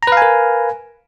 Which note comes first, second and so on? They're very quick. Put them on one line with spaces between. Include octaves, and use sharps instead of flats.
A#5 B4 F5 G#5 A#4